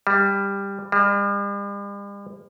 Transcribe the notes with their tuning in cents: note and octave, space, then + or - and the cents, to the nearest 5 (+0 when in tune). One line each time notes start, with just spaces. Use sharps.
G3 +15
G3 +45